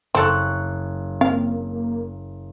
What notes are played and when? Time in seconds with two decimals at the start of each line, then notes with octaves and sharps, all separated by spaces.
0.15 F#1 C4 A4 C#6 F#6
1.21 A#3 C4 F5